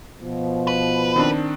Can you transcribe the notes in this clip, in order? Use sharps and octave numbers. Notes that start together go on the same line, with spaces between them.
B2 F3
B4
D#3 C4 D4